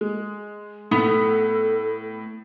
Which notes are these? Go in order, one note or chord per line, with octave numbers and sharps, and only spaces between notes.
G#3
A2 B3 A4